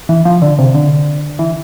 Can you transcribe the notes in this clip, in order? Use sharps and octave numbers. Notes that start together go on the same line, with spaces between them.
E3
F3
D3
C3
D3
E3